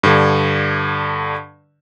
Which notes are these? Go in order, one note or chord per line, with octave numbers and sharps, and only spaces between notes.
G2 D3